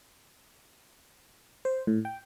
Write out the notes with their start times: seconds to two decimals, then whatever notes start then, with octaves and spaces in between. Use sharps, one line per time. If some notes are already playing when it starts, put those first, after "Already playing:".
1.65 C5
1.87 A2
2.05 G5